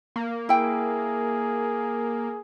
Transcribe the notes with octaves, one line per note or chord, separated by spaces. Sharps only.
A#3
E4 G#4 G5